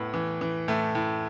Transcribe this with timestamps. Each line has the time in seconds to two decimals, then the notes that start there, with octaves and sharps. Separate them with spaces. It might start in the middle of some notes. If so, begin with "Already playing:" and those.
Already playing: A2 B3
0.14 E3
0.41 E3
0.68 A2 A3
0.95 A2